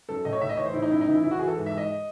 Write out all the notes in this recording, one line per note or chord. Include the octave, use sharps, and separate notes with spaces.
F#2 A4
A2 D#5
C#5
A2 E5
D#5
E3 C#5
C5
A2 E4
D#4
F#2 E4
D#4
E3 E4
E3 E4
F#4
E3 G#4
A4
G#2
E5
G#2 D#5